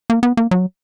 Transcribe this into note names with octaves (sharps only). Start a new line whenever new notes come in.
A#3
B3
A#3
F#3